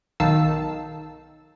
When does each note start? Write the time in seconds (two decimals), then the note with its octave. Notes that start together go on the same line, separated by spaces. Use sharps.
0.20 B1 D#3 D#4 F5 A5 E6